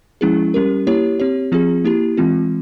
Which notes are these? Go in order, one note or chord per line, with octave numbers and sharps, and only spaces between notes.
F3 G#3 C#4 E4 G#4
G3 C#4 G4 A#4
A#3 E4 G4 C#5
C4 G4 C#5
F3 C4 F4 G#4
A#3 E4 G4
E3 G#3 C4 F4